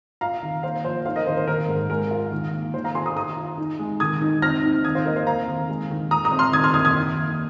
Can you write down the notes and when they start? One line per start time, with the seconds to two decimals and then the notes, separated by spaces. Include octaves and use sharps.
0.21 F4 F5 A#5
0.42 D#3
0.63 A#3 C5 F5
0.84 F3 C5
1.05 D#4 C5 F5
1.16 A#4 D#5
1.27 D#3 C5
1.37 C5
1.47 D#3 A#4
1.69 G#2
1.90 G#3 A#4
2.11 F4
2.32 D#3
2.53 A#3
2.74 D#3 C5
2.84 F5 A#5
2.95 F4 G#5 C6
3.06 A#5 D#6
3.16 D#3 A#5 D#6
3.37 F4
3.58 D#4
3.79 G#3
4.00 D#3 D#6 G#6
4.22 D#4
4.42 C4 F6 A#6
4.63 D#4
4.84 D#3 D#6 G#6
4.95 C5 F5
5.06 A#3 A#4 D#5
5.16 C5 F5
5.27 C4 F5 A#5
5.48 D#3
5.69 G#3
5.90 D#3
6.11 C4 A#5 D#6
6.25 A#5 D#6
6.32 C4
6.39 C6 F6
6.53 D#3 D#6 G#6
6.64 C6 F6
6.74 D#3 D#6 G#6
6.85 D#6 G#6
6.95 D#3
7.16 A#3